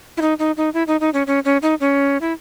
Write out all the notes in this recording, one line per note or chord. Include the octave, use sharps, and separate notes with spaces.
E4
D#4
D#4
D#4
E4
D#4
D#4
C#4
C#4
C#4
D#4
C#4
E4